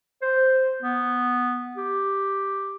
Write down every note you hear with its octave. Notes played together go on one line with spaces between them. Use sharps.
C5
B3
G4